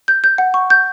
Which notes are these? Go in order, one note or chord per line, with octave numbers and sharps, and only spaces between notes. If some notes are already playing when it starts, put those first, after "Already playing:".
G6
G6
F#5
C#6
G6